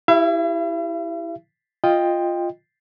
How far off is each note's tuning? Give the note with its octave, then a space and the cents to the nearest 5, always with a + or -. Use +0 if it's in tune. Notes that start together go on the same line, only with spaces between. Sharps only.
E4 +0 G4 +0 E5 +45
F4 +0 D#5 +0 G5 +15